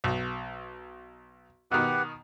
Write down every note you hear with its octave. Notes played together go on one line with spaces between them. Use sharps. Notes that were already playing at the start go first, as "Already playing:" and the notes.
B1
B2 D#3 G4 B4 F#5